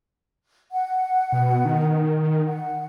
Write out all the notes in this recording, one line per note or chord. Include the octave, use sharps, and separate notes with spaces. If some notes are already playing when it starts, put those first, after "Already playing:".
F#5
B2
D#3
F#5